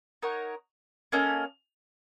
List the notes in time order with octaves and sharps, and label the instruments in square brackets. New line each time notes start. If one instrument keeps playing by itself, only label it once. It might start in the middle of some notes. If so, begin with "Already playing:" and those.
[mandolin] D#4 A#4 C#5 F#5
A#3 C#4 A4 D#5